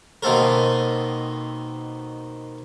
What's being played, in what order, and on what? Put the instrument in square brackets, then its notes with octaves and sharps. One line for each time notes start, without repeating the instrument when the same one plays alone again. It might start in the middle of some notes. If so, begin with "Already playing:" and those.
[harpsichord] B2 D#3 A#3 C4 A4 A#4